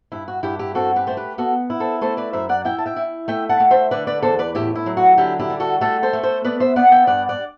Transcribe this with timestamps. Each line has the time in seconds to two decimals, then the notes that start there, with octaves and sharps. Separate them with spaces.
0.12 G2 E4
0.28 F#4
0.43 G2 E4 G4
0.59 E4 G4
0.75 C4 F#4 A4
0.96 G4 B4
1.07 A3 C5
1.17 G4 B4
1.38 B3 F#4 A4
1.70 E4
1.80 A4 C5
2.01 A3 A4 C5
2.17 B4 D5
2.33 F#2 C5 E5
2.49 D5 F#5
2.65 E4 E5 G5
2.78 A5
2.86 E5 G5
2.96 E4
3.28 A3 E5 G5
3.49 F#5 A5
3.60 A3
3.70 C5 E5
3.91 D3 B4 D5
4.07 B4 D5
4.22 E2 A4 C5
4.39 B4 D5
4.55 A2 E4 G4
4.75 E4
4.86 F#3
4.97 F#4
5.18 D3 E4 G4
5.39 E4 G4
5.50 G3
5.60 F#4 A4
5.81 A3 F#4 A4
6.03 A4 C5
6.13 A3
6.23 A4 C5
6.45 B3 B4 D5
6.60 C5 E5
6.76 B3 D5 F#5
6.92 E5 G5
7.07 G2 D5 F#5
7.29 D5 F#5